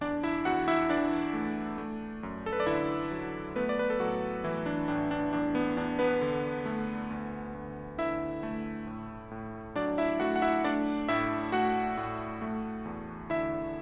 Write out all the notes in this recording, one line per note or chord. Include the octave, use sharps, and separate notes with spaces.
E2 D4 D5
E4 E5
E2 F#4 F#5
E4 E5
E3 D4 D5
A3
A3
F#2
A4
B4
D5
D3 E4 E5
F#3
A3 B3 B4
D5
B4
A4
A2 F#3 F#4
E3 A3 E4
D4
A2 D4
D4
E2 D4
B3
E2 D4
B3 B4
D3
A3
D2
D2
D3 E4 E5
A3
A2
A2
F#3 D4 D5
E4 E5
A3 F#4 F#5
F#5
E4 E5
A3 D4 D5
A2 E4 E5
A3 F#4 F#5
A2
A3
E2
D3 E4 E5